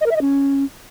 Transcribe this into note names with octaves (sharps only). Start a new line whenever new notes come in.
D#5
A#4
E5
D#5
C#4